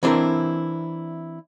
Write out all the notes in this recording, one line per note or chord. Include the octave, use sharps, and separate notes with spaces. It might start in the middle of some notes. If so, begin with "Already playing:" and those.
E3 C4 D4 E4 A#4